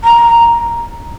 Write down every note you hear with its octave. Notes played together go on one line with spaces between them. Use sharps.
A#5